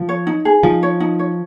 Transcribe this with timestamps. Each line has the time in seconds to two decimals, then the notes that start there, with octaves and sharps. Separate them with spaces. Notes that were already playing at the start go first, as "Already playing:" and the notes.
Already playing: F3
0.09 C#5
0.27 D#4
0.45 G#4
0.63 F3 D#4
0.83 C#5
1.00 D#4
1.19 C#5